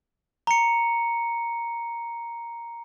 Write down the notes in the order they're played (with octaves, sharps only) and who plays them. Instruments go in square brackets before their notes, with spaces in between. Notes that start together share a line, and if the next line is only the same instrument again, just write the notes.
[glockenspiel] A#5 C#7